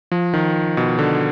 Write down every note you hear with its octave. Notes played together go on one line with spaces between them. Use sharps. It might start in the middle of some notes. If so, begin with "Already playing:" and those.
F3
D#3
B2
D3